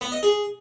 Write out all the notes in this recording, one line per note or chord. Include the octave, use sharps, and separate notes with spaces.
B3
D#5
G#4